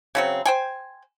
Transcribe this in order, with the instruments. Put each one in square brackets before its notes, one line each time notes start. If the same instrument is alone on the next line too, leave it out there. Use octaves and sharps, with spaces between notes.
[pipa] C#3 F#3 C4
C5 G5 G#5